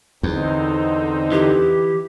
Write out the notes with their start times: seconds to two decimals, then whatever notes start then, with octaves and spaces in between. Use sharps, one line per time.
0.23 E2 D3 C4 D#4
1.32 E3 G4